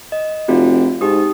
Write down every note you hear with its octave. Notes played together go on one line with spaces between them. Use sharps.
D#5
F1 C4 F4 F#4
G#2 D#4 G4 D#6